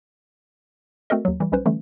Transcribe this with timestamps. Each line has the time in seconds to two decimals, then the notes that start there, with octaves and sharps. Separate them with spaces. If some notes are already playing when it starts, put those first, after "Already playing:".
1.10 A3 C4 F#4 A4 A#4 D#5
1.25 D#2 F#3
1.40 E3 G3
1.52 B1 G3 C#4 B4 C5
1.66 D3 E3 G3 A3 C#4